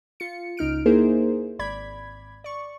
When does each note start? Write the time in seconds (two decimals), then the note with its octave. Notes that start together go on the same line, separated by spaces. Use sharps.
0.20 F4 C#7
0.57 C#2 D#4 F6 D7
0.86 A#3 D#4 E4 G#4 A#4 C5
1.59 G#1 D5 B5 G#6
2.44 D5 C#6